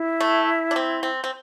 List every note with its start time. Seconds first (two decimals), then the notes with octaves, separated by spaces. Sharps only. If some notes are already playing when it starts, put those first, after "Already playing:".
Already playing: E4
0.20 A3
0.71 D4
0.76 C4
1.03 C4
1.24 C4